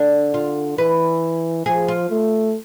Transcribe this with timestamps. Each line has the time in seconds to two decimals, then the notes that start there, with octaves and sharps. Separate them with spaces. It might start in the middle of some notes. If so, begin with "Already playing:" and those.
Already playing: D3 D4
0.34 F4
0.78 E3 B4
1.66 F3 G#4
1.88 F4
2.10 A3